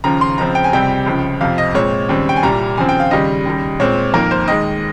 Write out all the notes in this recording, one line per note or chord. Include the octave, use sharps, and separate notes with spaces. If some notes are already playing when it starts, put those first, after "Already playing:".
D#2 C#3 F3 A#5
C6
C#2 C#3 F3 C4 A#5
G5
G#5
C#2 C3 G3 C4 G5
C#2 C#3 F3
F2 C3 F3 F5
D#5
A#2 G#3 C4 C#5
D#2 C#3 G3 C4
G5
G#5
C2 A#2 G3 A#5
D#2 C#3 F3 C4 G#5
G5
F5
D#2 C#3 G3 D#5
D#2 C#3 G3
A#2 G#3 C4 C#5
F2 D#3 A#3 A#4
C5
D#2 D#3 G#3 D#5